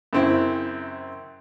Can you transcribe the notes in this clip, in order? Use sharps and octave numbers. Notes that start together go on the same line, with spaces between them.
F#2 C#3 C4 E4